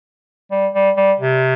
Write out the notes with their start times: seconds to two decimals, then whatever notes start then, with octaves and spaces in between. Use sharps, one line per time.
0.51 G3
0.74 G3
0.97 G3
1.20 C3